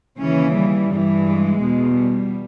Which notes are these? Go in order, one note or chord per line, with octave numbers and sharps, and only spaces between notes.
D#2 C#3 E3 C#4
G3
G2 E3
G#3
E2 B2
G3